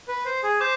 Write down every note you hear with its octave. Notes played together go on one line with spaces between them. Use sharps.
B4
C5
G#4
C5 D6 G6